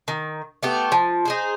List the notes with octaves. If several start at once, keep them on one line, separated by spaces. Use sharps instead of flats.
D#3
A3 B3 G4
F3
D#4 G#4 C5